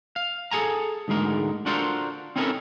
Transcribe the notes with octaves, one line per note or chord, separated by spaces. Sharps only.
F5
G#4 A4 G#5 A#5
D2 G#2 G#3 A#4
D4 F4 F#4 A4 A#4 C5
C4 C#4 D#4 E4 A4 A#4